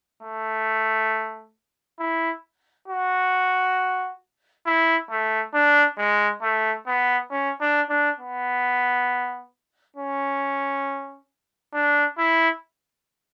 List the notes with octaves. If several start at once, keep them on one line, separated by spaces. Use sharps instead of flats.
A3
E4
F#4
E4
A3
D4
G#3
A3
B3
C#4
D4
D4
B3
C#4
D4
E4